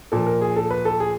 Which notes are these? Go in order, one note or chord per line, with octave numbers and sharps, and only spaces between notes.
A#2 F3 A4
A#4
G#4
A4
B4
A4
G#4